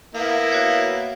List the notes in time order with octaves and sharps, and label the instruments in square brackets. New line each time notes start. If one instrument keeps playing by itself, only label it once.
[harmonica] A#3 B3 E4 [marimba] F5
[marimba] F#4 C#5 F5